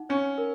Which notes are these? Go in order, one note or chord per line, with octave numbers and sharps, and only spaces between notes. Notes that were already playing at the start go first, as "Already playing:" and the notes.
Already playing: D#4 F#5
C#4 C#5
A#4